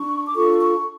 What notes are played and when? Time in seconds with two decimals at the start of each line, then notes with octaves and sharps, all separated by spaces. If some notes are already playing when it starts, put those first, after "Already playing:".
Already playing: D4 C#6
0.27 D6
0.35 D4 F4 A4 C#6
0.58 C#6